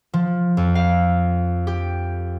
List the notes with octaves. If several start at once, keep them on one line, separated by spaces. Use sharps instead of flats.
F3
F2
F5
G4